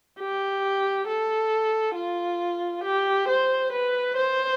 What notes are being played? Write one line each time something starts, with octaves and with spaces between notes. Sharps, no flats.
G4
A4
F4
G4
C5
B4
C5